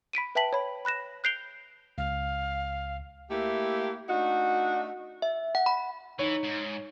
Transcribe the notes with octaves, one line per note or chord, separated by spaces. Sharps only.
B5 B6 D7 D#7
B4 E5 G5 A5 B6 F#7
C#5 B5
B5 F#6 A#6 E7
F#6 G6 C7 D7 F7 G7
C#2 F5
A3 A#3 E4 G4
A3 D4 D#4 F#4
E5
F#5
B5
E3 D#4 C#5
G#2